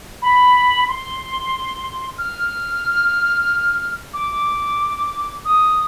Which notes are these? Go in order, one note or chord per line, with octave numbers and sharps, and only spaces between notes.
B5
C6
F6
D6
D#6